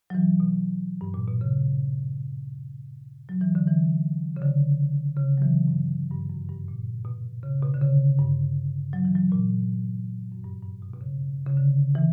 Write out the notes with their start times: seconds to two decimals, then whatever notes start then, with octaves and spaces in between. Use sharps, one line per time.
0.10 F#3
0.15 E3
0.40 B2
1.01 G2
1.14 A#2
1.28 B2
1.41 C#3
3.29 F#3
3.41 E3
3.55 D3
3.68 E3
4.36 C#3
4.42 D3
5.17 C#3
5.38 F#3
5.42 E3
5.68 G2
6.11 G2
6.30 F#2
6.49 G2
6.68 A#2
7.05 B2
7.43 C#3
7.62 B2
7.74 D3
7.81 C#3
8.19 G2
8.93 F#3
9.05 E3
9.16 F#3
9.32 A#2
10.32 F#2
10.44 G2
10.63 G2
10.82 B2
10.94 B2
11.01 C#3
11.46 C#3
11.57 D3
11.95 E3